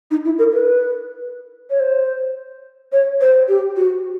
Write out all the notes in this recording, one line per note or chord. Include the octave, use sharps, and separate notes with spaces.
D#4
E4
A#4
B4
C#5
C5
C#5
C5
G4
F#4